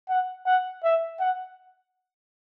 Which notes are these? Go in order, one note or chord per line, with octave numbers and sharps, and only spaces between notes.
F#5
F#5
E5
F#5